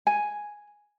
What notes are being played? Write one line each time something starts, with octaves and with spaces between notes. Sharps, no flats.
G#5